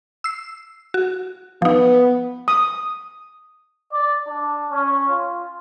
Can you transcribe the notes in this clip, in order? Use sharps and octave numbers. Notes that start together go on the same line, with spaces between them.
E6 C7
F#4
F3 B3 D#4
D#6
D5
D4
C#4
F4